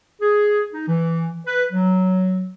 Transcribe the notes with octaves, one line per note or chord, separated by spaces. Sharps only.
G#4
D#4
E3
B4
F#3